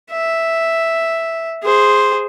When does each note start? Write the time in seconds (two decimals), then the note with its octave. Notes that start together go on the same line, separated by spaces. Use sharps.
0.11 E5
1.63 G#4 C5